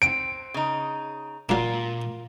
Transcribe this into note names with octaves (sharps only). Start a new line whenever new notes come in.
C4 D7
C#3 D#4
A#2 F#3 D4 F4 A#4